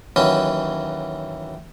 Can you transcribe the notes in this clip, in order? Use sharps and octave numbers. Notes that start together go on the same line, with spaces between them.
D#2 E3 F#3 C#4